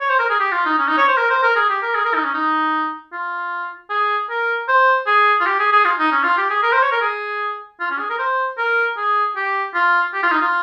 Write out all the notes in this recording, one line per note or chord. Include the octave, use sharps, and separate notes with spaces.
C#5
C5
A#4
G#4
G4
F4
D#4
C#4
D#4
C#5
C5
A#4
C5
A#4
G#4
G4
A#4
G#4
A#4
D#4
C#4
D#4
F4
G#4
A#4
C5
G#4
F4
G4
G#4
G#4
F4
D#4
C#4
F4
G4
G#4
A#4
C5
C#5
A#4
G#4
F4
C#4
G#4
A#4
C5
A#4
G#4
G4
F4
G4
F4
D#4
F4